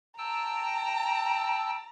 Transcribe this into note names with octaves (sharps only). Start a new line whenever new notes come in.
G5 A5 A#5 E6